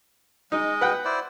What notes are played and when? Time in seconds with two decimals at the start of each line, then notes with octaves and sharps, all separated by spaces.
0.52 G#3 D#4 D#5
0.81 B4 F#5 G5
1.05 E4 C5 D5